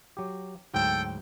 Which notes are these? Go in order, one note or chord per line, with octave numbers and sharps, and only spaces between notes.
F#3 G4
D2 G#2 F#3 A4 G5